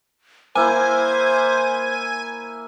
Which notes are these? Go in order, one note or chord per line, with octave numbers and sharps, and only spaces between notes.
A#3 E4 C5 G#5